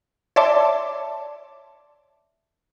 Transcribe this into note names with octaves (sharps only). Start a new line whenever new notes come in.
C#5 D5 E5 A5 C6 D6